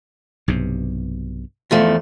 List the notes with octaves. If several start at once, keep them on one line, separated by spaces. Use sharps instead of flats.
B1 G2 C3
E2 F3 A3